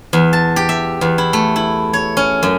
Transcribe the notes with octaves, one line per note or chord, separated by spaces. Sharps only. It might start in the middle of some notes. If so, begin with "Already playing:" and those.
E2
A5
G4
E5
E2
E4
A3
E4
C#5
C#4
F#2